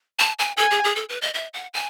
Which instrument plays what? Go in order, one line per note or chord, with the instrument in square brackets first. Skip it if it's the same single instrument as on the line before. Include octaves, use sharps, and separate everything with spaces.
[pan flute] A5
G#5
[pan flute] A4 [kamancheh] G#5
[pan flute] G#4
G#4
A4
B4
D#5
E5
F#5
G#5